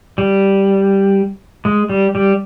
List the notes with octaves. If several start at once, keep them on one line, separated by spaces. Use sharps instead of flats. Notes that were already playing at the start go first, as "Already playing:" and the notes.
G3
G#3
G3
G3